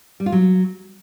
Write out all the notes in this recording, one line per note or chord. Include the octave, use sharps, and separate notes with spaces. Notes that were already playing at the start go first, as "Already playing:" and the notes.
G3
F4
F#3